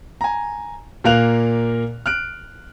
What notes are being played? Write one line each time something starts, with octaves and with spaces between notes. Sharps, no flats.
G#5 A#5
A#2 A#3 A#4 F5 F#6 F7
F6 F#6 D7